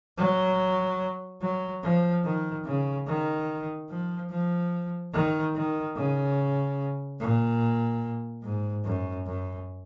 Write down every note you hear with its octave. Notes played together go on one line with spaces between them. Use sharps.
F#3
F#3
F3
D#3
C#3
D#3
F3
F3
D#3
D#3
C#3
A#2
G#2
F#2
F#2